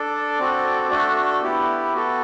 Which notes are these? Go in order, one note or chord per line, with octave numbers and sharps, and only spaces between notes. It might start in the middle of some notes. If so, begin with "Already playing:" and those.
Already playing: D4 A4 D5
C4 F#4 A4
A3 D4 F#4 A4
B3 E4 G4
B3 F#4 A4